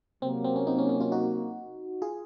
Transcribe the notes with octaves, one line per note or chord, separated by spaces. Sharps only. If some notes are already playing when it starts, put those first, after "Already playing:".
C3 F#3 A#3 C4
C4
C#4
C4 D#4
C#4
C#4
C#4 F4
D#4 F#4
F4 G#4